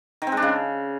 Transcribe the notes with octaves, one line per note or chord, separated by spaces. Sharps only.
D#3
C4
G#3
D4
C#3